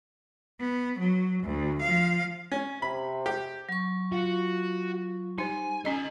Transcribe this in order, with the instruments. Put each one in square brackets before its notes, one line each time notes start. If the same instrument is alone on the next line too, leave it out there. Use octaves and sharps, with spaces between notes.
[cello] B3
F#3
D2
F3 F5
[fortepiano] C#4
[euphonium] C3 [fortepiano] B5
[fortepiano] G4
[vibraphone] F#3 C#6
[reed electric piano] F4 [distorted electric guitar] F#4
[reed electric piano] G3 [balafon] D#4 C5 [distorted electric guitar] G#5
[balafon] C#4 D#5 [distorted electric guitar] A4 G#5